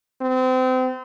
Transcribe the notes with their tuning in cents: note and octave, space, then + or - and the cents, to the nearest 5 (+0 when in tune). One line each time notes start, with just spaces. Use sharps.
C4 -30